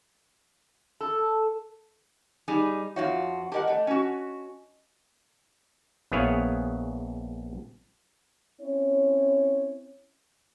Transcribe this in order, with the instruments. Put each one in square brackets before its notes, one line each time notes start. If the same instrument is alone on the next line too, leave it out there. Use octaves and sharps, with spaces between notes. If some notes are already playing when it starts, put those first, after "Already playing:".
[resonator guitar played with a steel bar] A4
G3 D#4 G#4
[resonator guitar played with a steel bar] F2 F4 F#4 [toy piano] D#4 C#5 E5
[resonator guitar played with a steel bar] G4 A#4 F#5 [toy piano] D#5 G#5 A5
[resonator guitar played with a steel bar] A3 [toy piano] D#5 A5
[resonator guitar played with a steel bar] C#4 F#4
[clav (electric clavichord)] A#1 B3 E4 G#4 C#5 F5
[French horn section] C4 C#4 E4 C#5